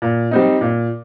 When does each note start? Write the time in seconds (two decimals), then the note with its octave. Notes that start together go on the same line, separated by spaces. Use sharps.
0.02 A#2
0.31 G3 C4 D#4
0.61 A#2